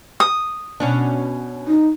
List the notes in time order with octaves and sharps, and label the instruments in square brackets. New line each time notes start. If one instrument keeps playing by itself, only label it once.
[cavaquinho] D#6
[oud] B2 C#4 D4
[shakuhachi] D#4